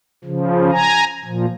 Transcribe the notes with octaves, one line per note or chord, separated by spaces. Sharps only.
C#3 F3
G#5 A#5
A#2 F3